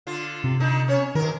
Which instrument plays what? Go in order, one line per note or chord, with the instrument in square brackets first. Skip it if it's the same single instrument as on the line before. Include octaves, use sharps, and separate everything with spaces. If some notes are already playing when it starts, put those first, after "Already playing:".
[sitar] D3 F4
[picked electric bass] C3
[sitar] D3 D4 D#4
C#4 C#5
[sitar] B2 A#4 [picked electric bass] D#3